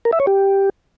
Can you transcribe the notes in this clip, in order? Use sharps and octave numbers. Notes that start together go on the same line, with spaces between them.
A#4
E5
C#5
G4